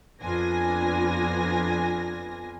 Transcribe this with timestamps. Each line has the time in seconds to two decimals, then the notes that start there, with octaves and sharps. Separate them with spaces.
0.22 F2 B3 D4 F4 G#5 A#6